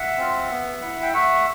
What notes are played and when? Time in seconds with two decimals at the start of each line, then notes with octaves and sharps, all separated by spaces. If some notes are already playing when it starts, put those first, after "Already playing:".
Already playing: E5 F#5
0.18 C4 F4
0.50 B3
0.82 E4
1.02 G5
1.13 A3 E5 F#5